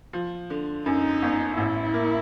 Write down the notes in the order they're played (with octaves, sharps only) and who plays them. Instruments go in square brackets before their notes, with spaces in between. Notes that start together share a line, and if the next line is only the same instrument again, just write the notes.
[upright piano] F3
D3
[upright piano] F#2 [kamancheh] D#4
[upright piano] G1
[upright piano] A1 [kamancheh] E4
[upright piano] A#3